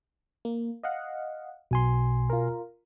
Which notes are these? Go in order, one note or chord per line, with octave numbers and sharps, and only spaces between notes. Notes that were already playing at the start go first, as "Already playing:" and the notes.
A#3
D#5 F5 F#5
B1 B2 G#5 C6
F4 A#4